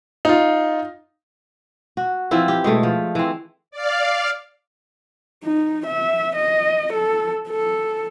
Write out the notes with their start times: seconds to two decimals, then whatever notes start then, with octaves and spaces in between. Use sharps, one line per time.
0.25 D#4 F4
1.97 F#4
2.31 E3 F3 C4 E4
2.48 G4
2.64 B2 G#3 A3
2.83 F3
3.15 E3 C4
3.71 D5 F5
5.43 D#4
5.86 E5
6.35 D#5
6.93 A4
7.49 A4